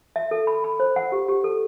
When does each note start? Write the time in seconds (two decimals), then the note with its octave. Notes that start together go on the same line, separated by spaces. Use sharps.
0.16 E5
0.31 A4
0.47 B5
0.64 B5
0.80 C5
0.96 F#5
1.12 G4
1.28 G4
1.44 A4